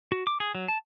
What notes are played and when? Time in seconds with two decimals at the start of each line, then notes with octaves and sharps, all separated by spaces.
0.12 F#4
0.27 D6
0.40 G#4
0.55 F#3
0.68 A5